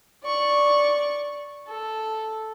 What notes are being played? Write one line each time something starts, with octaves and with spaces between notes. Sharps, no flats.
D5 C#6
A4